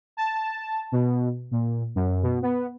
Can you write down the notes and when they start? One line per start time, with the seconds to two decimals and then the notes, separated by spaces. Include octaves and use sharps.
0.17 A5
0.92 B2
1.51 A#2
1.95 F#2
2.23 B2
2.42 B3